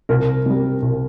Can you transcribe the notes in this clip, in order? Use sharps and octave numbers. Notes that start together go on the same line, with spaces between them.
C2 A#4
C3 G3
C2